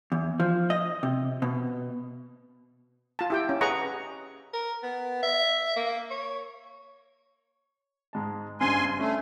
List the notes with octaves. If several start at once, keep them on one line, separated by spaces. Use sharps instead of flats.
E2
F3
D#5
C3
B2
F4 A5
E4 G4 G5
C#4
G#4 B4 D#5 F#5 A#5 C#6
A#4
B3
E5
A#3
C#5
G#2 G#3 A5
F#1 G2 C#3 G#5 C6
A3 C#4 D4